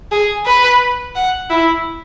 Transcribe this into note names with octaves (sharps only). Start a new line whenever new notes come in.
G#4
B4
F#5
E4